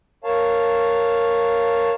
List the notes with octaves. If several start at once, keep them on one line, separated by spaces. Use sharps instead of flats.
A#4 C#5 F5 A5